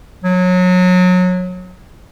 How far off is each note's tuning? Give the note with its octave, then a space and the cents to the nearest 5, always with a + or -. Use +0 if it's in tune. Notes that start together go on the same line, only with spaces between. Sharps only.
F#3 -25